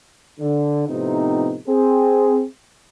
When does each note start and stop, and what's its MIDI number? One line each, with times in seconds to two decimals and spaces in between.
0.40 0.83 50
0.88 1.56 45
0.88 1.56 48
0.88 1.56 53
0.88 1.56 59
0.88 1.56 60
0.88 1.56 63
1.67 2.43 60
1.67 2.43 68